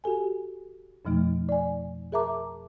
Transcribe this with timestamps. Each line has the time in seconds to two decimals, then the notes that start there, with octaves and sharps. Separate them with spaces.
0.04 F#4 G4 A4 G#5
1.05 F2 B2 F3 A3 D#4
1.49 D5 G#5
2.12 G#4 A#4 E5 A5 A#5 D6